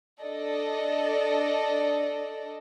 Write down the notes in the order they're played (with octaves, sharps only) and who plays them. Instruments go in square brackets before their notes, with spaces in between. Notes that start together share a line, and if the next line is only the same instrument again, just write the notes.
[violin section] D4 A4 D5 D#5